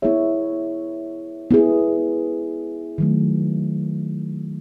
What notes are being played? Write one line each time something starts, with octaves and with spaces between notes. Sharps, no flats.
B3 E4 G#4 C#5 E5
B3 E4 G#4
D#3 F#3 A3